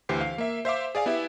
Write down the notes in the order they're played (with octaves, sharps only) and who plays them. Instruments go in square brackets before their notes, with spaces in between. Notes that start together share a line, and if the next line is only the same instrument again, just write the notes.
[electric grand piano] D2 E3 G4 C5 C7
F5
A#3 E5
C5 E5 F5 D6
G#4 D5 F5 G#5
B3 E4 G4 E5